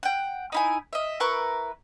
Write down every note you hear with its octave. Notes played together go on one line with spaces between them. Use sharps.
F#5 G5
D#4 E4 G#5
D#5 E5
E4 A#4 B4 C#6